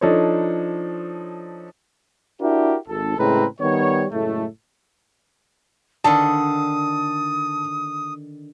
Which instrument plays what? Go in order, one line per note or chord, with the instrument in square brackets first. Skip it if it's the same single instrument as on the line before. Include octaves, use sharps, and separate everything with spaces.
[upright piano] F3 D4 D#4 A4 C5 C#5
[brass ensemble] D4 E4 F#4 G4 A#4
G#1 A4
A2 C#3 G#3 C4 B4 A#5
D#3 G3 B3 C#5
F#1 A2 G#3 A3
[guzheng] D3 D#3 [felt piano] A5 [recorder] D#6